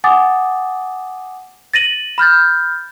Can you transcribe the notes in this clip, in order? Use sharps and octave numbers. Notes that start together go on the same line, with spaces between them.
F#5 G#5 D6 D#6 A6
A6 A#6 D#7 F#7
B5 F6 G6 A6